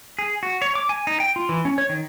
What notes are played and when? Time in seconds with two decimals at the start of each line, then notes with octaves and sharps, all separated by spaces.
0.19 G#4
0.43 F#4
0.62 C#5
0.75 D6
0.89 G#5
1.07 D#4
1.20 G5
1.36 F4
1.49 E3
1.65 C#4
1.78 C#5
1.89 D#3